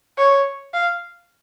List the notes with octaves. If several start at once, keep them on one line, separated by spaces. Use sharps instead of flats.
C#5
F5